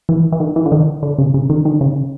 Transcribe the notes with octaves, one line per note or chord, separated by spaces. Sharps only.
E3
E3
D#3
E3
D3
D#3
D3
C#3
C#3
D#3
D#3
C#3